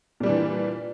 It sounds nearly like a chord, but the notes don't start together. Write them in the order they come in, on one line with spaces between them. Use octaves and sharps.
A#2 G3 D4 E3